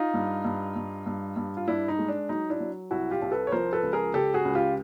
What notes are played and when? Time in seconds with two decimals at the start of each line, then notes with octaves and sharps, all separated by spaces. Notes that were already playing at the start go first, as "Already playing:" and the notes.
Already playing: D#4 F4
0.14 G2
0.45 G2
0.76 G2
1.06 G2
1.36 G2
1.57 F4
1.68 G2 D4 E4
1.88 D#4
1.99 G#3
2.08 D4
2.29 F#3 D#4
2.50 D4 E4
2.60 F#3
2.91 C2 E4 F#4
3.11 F4 G4
3.22 C2
3.32 A4 B4
3.47 C#5
3.52 F3 A#4 C5
3.73 A4 B4
3.83 C#2
3.93 G#4 A#4
4.13 C#3 G4 A4
4.34 F#4 G#4
4.45 C#2
4.55 F4 G4